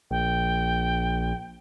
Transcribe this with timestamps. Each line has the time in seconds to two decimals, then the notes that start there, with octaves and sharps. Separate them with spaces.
0.11 A#1 G5